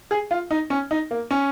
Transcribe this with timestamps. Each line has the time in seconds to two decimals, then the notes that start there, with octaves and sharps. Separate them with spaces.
0.11 G#4
0.31 F4
0.51 D#4
0.70 C#4
0.91 D#4
1.11 A#3
1.31 C#4